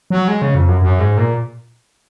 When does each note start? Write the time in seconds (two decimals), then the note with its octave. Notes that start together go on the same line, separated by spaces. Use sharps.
0.10 F#3
0.28 G#3
0.42 C#3
0.55 F2
0.69 F#2
0.82 F#2
0.99 G#2
1.18 A#2